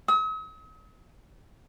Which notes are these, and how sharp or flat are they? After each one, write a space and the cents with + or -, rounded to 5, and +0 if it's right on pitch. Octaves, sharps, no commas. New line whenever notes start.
D#6 +45